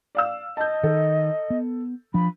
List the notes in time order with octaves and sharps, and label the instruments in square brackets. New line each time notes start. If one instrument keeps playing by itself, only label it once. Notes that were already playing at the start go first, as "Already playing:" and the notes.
[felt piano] D5 F5 E6
[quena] D#5 [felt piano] A5 G6
[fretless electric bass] D#3 [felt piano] A4
[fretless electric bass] B3
[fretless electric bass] F3 D4 [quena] B5